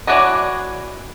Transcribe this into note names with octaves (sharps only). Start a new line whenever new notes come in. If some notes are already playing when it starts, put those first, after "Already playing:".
E3 D4 F#4 C#5 D#5